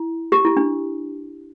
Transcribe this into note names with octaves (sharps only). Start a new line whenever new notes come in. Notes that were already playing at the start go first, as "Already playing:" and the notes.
Already playing: E4
G4
E4
D4